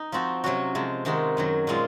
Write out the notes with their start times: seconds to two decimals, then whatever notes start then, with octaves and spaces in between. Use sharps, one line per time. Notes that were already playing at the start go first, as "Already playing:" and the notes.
Already playing: D#4
0.12 F3 C4 F#4
0.44 C3 F#3 C#4 F#4
0.75 C3 F3 G#3
1.05 C3 D#3 G#3 D#4 F#4
1.37 F#2 D#3 F#3
1.67 A#2 G#3 C4 F4